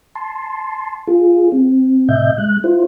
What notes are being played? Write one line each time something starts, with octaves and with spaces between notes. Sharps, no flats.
A5 C6
F4 G#4
C4
A2 C3 D#5 E5 G6
G#3 F#6
E4 F4 C5